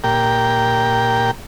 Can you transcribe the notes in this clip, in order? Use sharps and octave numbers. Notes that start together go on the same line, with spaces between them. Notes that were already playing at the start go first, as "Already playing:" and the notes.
A#2 G4 A#4 G5